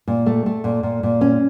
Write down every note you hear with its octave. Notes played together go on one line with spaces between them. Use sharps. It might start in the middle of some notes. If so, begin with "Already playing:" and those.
A#2
A3
A3
A#2
A#2
A#2
C#4